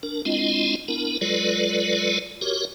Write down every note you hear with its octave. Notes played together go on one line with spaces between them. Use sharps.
D4 A#4
G#3 C4 D4 E4 F4 D#5
B3 D4 E4 A#4
F#3 G#3 F4 A4 B4 D5
F#4 G4 A#4 C#5